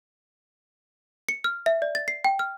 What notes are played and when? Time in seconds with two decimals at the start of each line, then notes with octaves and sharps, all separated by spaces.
1.29 C#7
1.44 F6
1.66 E5
1.82 D5
1.95 A6
2.08 C7
2.24 G5
2.39 F6